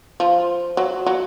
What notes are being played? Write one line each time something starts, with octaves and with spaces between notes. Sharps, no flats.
F3
F#3
F#3